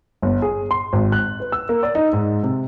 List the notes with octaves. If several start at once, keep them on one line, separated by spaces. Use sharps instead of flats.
G1
G#4
C6
G#1
F#6
B4
E6
A#3
D5
D#4
G#2
C3